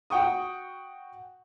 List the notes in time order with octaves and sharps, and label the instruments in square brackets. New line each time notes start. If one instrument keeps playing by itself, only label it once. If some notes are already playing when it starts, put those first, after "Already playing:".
[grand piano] F#4 F#5 G5 C#6 D#6